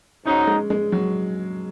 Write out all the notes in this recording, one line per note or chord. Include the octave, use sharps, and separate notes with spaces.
G#2 F#3 C#4 D#4
G#3
G#3
F#3